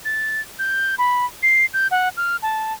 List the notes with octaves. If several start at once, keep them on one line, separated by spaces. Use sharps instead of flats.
A6
G6
B5
C7
G6
F#5
F6
A5